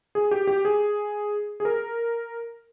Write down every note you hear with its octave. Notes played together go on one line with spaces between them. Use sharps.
G#4
G4
G4
G#4
G#4
A#4